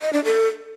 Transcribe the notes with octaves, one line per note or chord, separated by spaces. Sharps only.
D#5
D4
A4